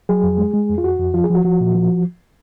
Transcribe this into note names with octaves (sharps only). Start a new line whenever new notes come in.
F#3 G#4
F2
G#3
G#3
F2
F4
F2 F#4
F2
F3 F4
G#4
F3 F#4
F3 F#4
A#2
F3